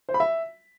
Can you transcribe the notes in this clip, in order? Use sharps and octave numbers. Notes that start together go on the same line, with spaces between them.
C5
B5
E5